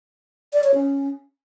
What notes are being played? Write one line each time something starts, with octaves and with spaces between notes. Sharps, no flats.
D5
C#5
C#4